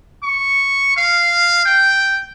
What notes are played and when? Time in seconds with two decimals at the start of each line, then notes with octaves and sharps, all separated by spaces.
0.23 C#6
0.96 F5
1.65 G5